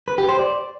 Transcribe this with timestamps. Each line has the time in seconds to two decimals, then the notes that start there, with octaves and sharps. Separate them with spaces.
0.08 B4
0.18 G4
0.29 C5
0.39 D5